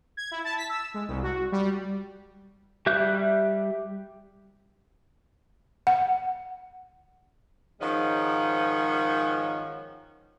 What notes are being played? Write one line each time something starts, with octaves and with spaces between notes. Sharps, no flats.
G#6
E4
A5
B6
E6
G#3
C2
F#4
G3
G3 G4 E5 F#6 G6
F#5
G#2 D#3 F3 G#3 C#4 F#5